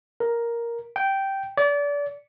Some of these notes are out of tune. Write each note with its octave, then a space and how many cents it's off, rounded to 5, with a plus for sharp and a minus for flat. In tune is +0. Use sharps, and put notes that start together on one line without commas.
A#4 +5
G5 -10
D5 -30